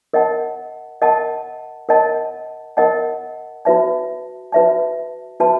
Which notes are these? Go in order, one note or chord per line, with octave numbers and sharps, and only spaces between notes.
A#4 D#5 F#5 A5
A#4 D#5 F#5 A5
A#4 D#5 F#5 A5
A#4 D#5 F#5 A5
F#4 B4 E5 A5
F#4 B4 E5 A5
F#4 B4 E5 A5